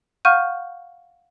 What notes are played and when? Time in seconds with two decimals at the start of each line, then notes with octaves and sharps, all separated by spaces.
0.25 F5 F#5 C#6 F6 G6 D#7